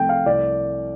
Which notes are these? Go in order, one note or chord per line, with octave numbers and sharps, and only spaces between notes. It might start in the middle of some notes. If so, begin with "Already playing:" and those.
Already playing: C2 C3 F3 A3 G5
F5
C2 D5